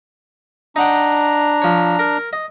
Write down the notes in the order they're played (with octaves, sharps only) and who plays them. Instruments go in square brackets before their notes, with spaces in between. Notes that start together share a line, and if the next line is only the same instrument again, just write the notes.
[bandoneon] D4 A#5 [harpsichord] D#4 F#5 G5
[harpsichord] F3 C#5
A#4
D#5